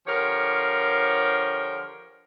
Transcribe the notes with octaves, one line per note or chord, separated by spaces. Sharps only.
D3 F3 G4 A#4 C#5